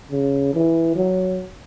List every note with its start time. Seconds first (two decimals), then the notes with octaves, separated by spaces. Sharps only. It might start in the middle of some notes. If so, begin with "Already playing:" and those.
0.11 C#3
0.54 E3
0.95 F#3